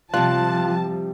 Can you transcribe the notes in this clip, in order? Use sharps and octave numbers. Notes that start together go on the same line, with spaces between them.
C3 F3 G3 F4 A5 F#6